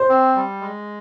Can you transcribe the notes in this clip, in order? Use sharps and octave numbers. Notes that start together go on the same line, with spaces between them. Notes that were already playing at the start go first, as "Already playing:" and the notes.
Already playing: C5
C4
G3
G#3